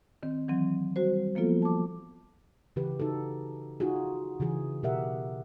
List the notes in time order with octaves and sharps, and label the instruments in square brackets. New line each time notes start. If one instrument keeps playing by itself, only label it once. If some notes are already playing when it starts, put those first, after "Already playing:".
[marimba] D#3 C4
D#3 E3 F#3 C4
G3 F#4 C5
F3 A#3 B3 F4 A4
A5 D6
[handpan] C#3 E3 G4 B4
D#4 F#4 A4
D#4 F4 F#4 G#4
C#3 E3 G#4
B2 G4 A#4 E5 F#5